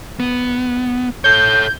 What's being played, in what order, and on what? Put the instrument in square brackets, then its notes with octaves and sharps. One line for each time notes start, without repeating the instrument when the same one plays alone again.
[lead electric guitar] B3
[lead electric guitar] A4 C#5 [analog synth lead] G6